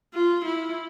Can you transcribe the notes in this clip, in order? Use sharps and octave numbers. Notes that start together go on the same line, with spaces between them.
F4
E4